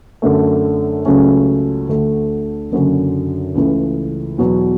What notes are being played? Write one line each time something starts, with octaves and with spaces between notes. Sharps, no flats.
F#2 D3 A3
C#2 C#3 F#3 A3 C#4
D2 D3 A3
F#1 F#2 D3 F#3 C#4
C#2 C#3 E3 A3
E2 B2 F#3